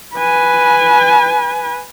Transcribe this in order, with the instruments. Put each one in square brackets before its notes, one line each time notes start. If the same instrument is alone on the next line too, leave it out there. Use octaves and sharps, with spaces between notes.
[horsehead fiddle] B4 G#5